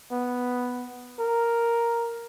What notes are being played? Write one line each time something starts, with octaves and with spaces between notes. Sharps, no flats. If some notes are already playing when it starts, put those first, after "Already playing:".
B3
A#4